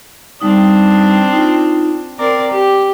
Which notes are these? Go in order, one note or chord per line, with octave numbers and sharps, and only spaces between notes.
G3 C4 D4 D#4 D#6
D#4 F4
C4 A#4 D5 D6
G4